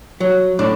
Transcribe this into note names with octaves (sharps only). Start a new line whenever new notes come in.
F#3
A2 D4